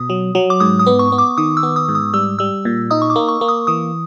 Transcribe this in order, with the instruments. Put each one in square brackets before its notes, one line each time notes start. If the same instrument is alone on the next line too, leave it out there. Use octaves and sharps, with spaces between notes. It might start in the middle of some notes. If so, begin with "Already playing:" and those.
Already playing: [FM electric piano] B2 [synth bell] D#6
[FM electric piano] F#3
F#3
[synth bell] D6
[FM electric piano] G#2 [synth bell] D#6
[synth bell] D#6
[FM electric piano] B3
[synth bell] C#6
[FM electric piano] B3
[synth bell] D6
[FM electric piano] D#3 [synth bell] D#6
[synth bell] E6
[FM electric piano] B3
[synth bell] D#6
[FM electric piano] G#2
[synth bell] D#6
[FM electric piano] G3 [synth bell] E6
[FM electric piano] G3 [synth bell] E6
[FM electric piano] A#2
[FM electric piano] D#4 [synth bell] D#6
[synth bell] C#6
D6
[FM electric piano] A#3
[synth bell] C#6
[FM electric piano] A#3
[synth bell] D#6
[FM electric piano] E3 [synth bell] D#6